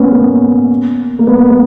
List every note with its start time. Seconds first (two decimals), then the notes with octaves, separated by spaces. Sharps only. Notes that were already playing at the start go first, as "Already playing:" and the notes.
Already playing: A#3 B3 C#4
0.12 A#3
1.19 A#3
1.27 B3
1.50 B3